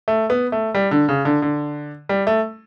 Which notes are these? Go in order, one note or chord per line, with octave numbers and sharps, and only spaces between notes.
A3
B3
A3
G3
D3
C#3
D3
D3
G3
A3